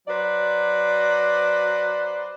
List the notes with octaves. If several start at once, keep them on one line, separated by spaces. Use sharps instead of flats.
F#3 B4 C5 D5